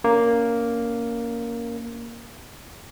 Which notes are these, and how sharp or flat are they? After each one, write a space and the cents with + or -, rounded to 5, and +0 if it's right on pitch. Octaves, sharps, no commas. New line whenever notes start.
A#3 +0 C#4 +25